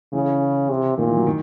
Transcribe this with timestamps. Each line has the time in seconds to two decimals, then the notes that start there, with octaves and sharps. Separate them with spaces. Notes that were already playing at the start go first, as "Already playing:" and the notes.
0.13 C#3 E3
0.70 C3
0.98 A#2 D#3
1.07 E3
1.17 F#3
1.27 D#3